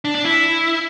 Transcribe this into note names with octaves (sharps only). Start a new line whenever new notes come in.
D4
D4
E4